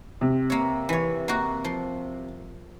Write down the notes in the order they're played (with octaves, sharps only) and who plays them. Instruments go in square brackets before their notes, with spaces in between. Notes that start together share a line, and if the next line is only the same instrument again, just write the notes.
[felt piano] C3
[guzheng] A#3 C#5
E3 C#5
A#3 F#4
F3 C6